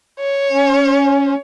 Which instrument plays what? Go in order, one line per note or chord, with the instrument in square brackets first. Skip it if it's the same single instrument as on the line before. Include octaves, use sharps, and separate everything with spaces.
[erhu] C#5
[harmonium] C#4